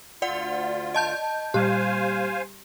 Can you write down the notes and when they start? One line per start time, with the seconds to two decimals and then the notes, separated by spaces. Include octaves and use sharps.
0.22 D2 F4 D5 F#5
0.94 D#5 A5 G6
1.54 A#2 G3 G4 C5 F5 G#5 F6